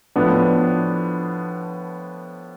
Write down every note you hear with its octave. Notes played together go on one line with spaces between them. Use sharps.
A2 F3 B3 D4